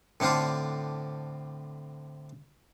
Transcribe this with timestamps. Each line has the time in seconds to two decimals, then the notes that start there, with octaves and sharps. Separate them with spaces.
0.20 A2 D3 C4 D4 F4